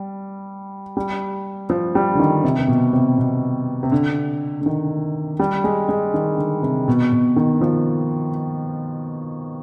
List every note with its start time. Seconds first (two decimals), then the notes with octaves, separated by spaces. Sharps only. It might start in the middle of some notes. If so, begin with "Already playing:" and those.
Already playing: G3
0.97 G3
1.70 F3
1.95 G3
2.15 D3
2.20 D#3
2.44 C3
2.58 C3
2.68 B2
2.93 C3
3.18 B2
3.83 C3
3.92 D3
4.61 D3
4.66 D#3
5.39 G3
5.64 G#3
5.89 G#3
6.14 D#3
6.37 D3
6.63 C3
6.88 B2
7.13 B2
7.36 D#3
7.61 F3